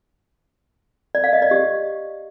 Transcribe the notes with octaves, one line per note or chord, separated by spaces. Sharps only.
D5
F5
D#5
D5
G4